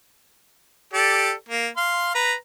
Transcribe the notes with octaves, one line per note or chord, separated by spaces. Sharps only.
G4 A4 D5
A#3
F5 C6
B4 A#5